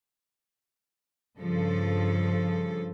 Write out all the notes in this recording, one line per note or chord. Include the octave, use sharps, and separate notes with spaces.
G2 C#3 F3 A4